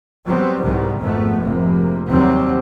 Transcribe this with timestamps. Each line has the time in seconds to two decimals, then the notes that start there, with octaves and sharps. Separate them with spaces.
0.26 F#3 G3 B3 C4
0.62 C2 G#2 C3 D#3 G3 B3
1.00 G#1 F2 G#2 A3 B3
1.40 F1 G#2 C3 A#3
2.10 D#2 C3 F#3 G3 C4